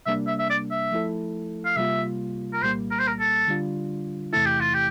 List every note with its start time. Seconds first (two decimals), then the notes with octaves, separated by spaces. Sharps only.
0.06 C3 G3 A#3 D4 E5
0.27 E5
0.39 E5
0.50 D5
0.71 E5
0.92 F3 A3 E4 A4
1.65 F5
1.77 C3 G3 A#3 F4 E5
2.54 A#4
2.62 C2 A#2 G3 A#3 C5
2.91 A#4
3.00 C5
3.08 A#4
3.19 A4
3.47 D3 G3 D4 F4
4.33 E2 C3 E3 A3 E4 A4
4.46 G4
4.61 F4
4.74 G4